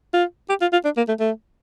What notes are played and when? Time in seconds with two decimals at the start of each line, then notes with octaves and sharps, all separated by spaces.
0.13 F4
0.49 G4
0.61 F4
0.73 F4
0.85 D4
0.97 A#3
1.08 A3
1.20 A3